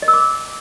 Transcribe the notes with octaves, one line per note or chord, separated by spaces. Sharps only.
D#5
E6
D6